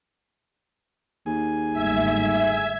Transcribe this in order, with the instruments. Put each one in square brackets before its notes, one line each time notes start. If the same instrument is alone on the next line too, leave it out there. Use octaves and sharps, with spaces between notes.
[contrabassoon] D#2 [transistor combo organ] G#4 G#5
[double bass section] G1 G#2 A3 [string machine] E5 G#6